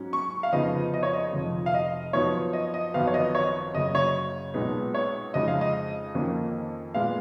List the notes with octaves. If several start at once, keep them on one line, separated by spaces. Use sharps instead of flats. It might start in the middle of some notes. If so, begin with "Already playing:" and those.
Already playing: G#2 F#3 C#4
C#6
F5
F2 C#3 F3 B3 D#4 D#5
D#5
C#5
D#5
F1 F2 F3
F5
D#5
F#2 F3 B3 D#4 C#5
D#5
D#5
G#1 F#2 F3 B3 F5
C#5
D#5
C#5
F#1 F#2 C#3 F#3 D#5
C#5
B1 A#2 G#3 B3 D#4
C#5
F2 C#3 G#3 D#4 D#5
F5
D#5
F2 D#3 A#3 C#4
A#2 G#3 B3 F5